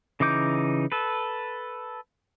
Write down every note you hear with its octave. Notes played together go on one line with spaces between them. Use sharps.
C#3 E3 D#4 D6 G6
A4 B4